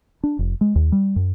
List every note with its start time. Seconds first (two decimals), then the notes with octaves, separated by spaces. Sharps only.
0.24 D4
0.39 F1
0.61 G#3
0.76 D#2
0.92 G3
1.16 F#2